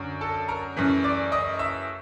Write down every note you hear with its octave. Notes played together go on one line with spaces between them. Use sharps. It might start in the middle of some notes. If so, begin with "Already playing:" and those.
Already playing: F#2 D3 F#3
A4 A5
A#4 A#5
F#2 C#3 E3 A3
D5 D6
D#5 D#6
E5 E6